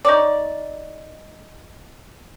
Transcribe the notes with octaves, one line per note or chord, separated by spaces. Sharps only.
D#4 C#5 D5